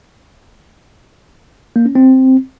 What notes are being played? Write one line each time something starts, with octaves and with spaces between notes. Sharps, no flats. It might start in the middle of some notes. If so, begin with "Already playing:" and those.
A#3
C#4
C4